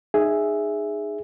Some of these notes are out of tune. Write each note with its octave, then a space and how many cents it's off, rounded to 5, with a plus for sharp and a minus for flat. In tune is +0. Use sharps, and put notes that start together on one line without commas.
D#4 -25 G#4 +0 E5 +0